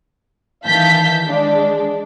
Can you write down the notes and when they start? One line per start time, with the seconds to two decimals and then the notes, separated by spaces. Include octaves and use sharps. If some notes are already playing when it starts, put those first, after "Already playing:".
0.65 D#3 E3 F5 A5 G6 B6
1.26 G#3 D4